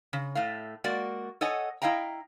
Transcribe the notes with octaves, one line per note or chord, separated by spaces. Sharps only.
C#3
A2 A3 F5
G#3 A#3 F#4 D5
A4 C#5 D#5 F#5 G#5
E4 D#5 F5 G5 A#5